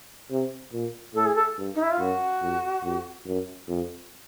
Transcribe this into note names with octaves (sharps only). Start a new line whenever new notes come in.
C3
A#2
A2 A4
G#4
A4
G2
D#4
E4
F4
F#2 F#4
F2
F2
F#2
F2